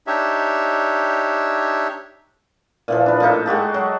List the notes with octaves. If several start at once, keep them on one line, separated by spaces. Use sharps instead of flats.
D4 D#4 G4 C#5 E5
A#2 E3 F3
D4 B4
A2 A#3 D#4 E5
G#3 F#4 G4 A4
F#3